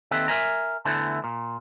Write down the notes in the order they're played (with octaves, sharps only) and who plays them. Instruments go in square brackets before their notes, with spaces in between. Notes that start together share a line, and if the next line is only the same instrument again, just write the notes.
[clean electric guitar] D#2 C4 A4 B4 E5
A#4 C5 E5 G#5 A#5
E2 D3 E3 A3
A#2